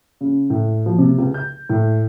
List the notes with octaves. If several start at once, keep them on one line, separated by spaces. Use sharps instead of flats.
C#3
A2
F3
C3
C#2
G6
A2